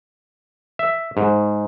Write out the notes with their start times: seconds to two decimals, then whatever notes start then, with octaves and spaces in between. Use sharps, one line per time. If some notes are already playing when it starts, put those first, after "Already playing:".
0.79 E5
1.17 G#2